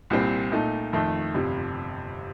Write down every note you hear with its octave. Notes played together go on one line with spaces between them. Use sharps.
C2 A#2 G3 C4
A#2 A3 D#4 A4
F2 D#3 A3
G1 F2 C3 G3